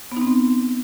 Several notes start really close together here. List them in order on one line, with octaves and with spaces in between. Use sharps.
B3 D#4 C4